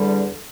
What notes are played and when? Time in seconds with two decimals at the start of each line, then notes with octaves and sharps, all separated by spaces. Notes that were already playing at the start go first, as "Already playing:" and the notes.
Already playing: E2 D3 G3